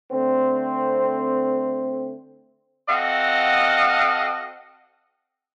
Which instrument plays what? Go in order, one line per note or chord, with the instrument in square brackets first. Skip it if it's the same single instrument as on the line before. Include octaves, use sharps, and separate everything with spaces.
[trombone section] D3 A3 C4
[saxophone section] C4 F#4 A4 D#5 F5 F#5